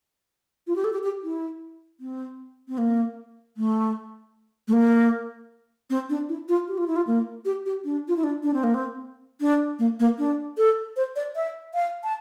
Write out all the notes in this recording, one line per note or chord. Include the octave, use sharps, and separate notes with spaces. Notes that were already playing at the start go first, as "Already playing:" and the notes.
F4
G4
A4
G4
G4
E4
C4
C4
A#3
A3
A3
A#3
C4
D4
E4
F4
G4
F4
E4
F4
A#3
G4
G4
D4
F4
E4
D4
D4
C4
A#3
C4
D4
A#3
A#3
D4
A4
C5
D5
E5
F5
A5